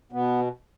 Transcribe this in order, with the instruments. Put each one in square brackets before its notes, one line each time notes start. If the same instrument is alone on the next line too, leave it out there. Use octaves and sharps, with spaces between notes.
[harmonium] B2 B3